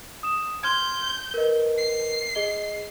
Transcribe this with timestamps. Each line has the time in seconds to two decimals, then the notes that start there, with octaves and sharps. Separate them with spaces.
0.23 D#6 E7
0.63 C6 F6 G6 G#6
1.34 A#4 B4 D#5
1.78 C7
2.35 G#4 D#5 G7